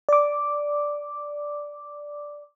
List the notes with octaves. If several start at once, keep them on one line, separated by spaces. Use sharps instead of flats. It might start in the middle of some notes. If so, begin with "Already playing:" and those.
D5 D6